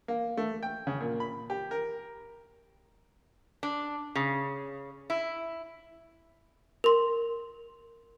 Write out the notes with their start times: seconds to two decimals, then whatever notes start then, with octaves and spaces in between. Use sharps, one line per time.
0.08 A#3
0.37 A3
0.63 G5
0.87 C#3
1.00 A#2
1.20 B5
1.50 G4
1.71 A#4
3.63 D4
4.15 C#3
5.10 E4
6.84 A#4 C6